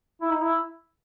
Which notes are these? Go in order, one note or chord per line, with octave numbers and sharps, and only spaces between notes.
E4
D#4
E4